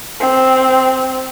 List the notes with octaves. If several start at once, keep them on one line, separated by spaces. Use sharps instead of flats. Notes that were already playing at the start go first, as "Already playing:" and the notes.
C4